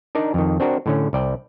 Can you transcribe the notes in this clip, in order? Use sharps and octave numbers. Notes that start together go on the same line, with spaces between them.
D4 D#4 A#4 D5
F2 D#3
C4 D4 F#4 A#4
A2 D3 C#4
C2 D5 G5